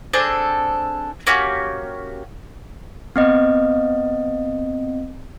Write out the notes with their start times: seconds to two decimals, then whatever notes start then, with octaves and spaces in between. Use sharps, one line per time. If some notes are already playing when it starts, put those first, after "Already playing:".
0.13 C4 D4 G#4 A4
1.27 A#3 C#4 F#4 G4
3.16 B3 C4 D#5